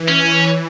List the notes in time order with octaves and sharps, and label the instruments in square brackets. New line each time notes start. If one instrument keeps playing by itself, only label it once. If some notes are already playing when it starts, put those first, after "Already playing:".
Already playing: [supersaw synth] E3
[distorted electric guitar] C#4